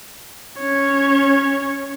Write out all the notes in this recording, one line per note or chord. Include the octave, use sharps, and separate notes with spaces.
C#4 C#5